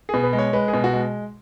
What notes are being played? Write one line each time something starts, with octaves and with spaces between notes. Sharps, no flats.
B2 G#4
B4
G#3
C#5
G#3 B4
G#4
B2
F#4
G#3